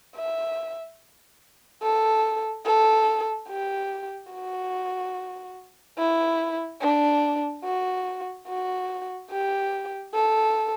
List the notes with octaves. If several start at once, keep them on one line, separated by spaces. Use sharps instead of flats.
E5
A4
A4
G4
F#4
E4
D4
F#4
F#4
G4
A4